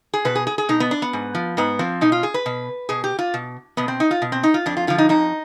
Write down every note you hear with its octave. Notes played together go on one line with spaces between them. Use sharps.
G#4
B2 B4
G#4
G#4
G#4
B2 D#4
B3
D4
B3
G#2
F3
G#2 B3
F3 C4
B2 D#4
F4
G#4
B4
B2
B2 G#4
G4
F4
B2
B2 B3
C4
D#4
F4
B2
C4
D#4
F4
F2 D4
F4
D3 F3 F4
D#4
F2 D#4